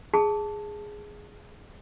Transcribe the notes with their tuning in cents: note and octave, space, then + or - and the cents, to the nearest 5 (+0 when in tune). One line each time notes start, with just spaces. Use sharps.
G#4 +0 A5 +0 D#6 +0